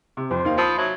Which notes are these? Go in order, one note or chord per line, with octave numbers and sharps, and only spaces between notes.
C3
F2 C5
D#2 D#4 F5
F3 B5 D#6
F#3 E5